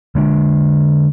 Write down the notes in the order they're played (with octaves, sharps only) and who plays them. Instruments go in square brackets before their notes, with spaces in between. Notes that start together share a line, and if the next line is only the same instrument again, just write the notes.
[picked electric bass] D3 G#3 D4